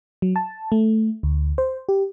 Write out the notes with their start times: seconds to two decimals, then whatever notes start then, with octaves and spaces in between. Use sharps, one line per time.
0.22 F#3
0.36 A5
0.72 A3
1.23 D2
1.58 C5
1.89 G4